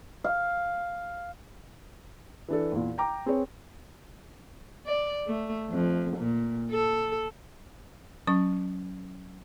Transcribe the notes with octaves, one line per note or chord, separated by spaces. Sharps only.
F5
E3 D4 A4
E2 A#2
G5 A#5 D6
C4 G#4 B4 C#5
D5
A3
F2
A#2
A4
F#3 C#4 C#6